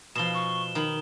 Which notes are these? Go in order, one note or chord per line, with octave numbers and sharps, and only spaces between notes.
B2 F3 E7 G7
C#6
D#3 B5